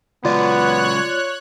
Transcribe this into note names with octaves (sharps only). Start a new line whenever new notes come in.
C#3 F#3 G#3 B3 F4 C#5 D5 F#6